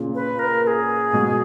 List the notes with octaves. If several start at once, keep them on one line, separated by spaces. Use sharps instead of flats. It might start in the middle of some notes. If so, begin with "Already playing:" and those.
Already playing: A#2 C#3
B4
A#4
A#4
G#4
G#2 B2